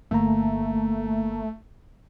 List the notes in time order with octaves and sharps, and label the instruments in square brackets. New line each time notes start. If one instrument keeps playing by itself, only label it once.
[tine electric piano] G1 A#3 A#5 [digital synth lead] A3